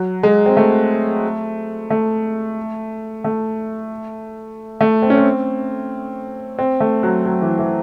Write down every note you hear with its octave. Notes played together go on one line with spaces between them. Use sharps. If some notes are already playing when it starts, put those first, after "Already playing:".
Already playing: F#3
G#3
C4
A3
A3
A3
A3
C4
C#4
C4
C4
A3
F#3
F#3
E3
E3